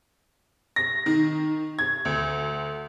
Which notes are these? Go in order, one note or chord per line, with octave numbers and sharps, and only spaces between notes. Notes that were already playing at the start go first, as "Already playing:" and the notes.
A#6
D#3
G#6
D2